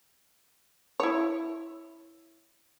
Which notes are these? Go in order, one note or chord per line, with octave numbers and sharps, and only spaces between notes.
E4 C#5